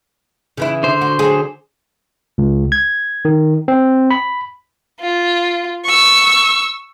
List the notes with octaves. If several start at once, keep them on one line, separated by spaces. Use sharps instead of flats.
C#3 E3 E4
D3 C5
F#4
F#3 G#4
C#2
G#6
D#3
C4
B5
F4
C#6 E6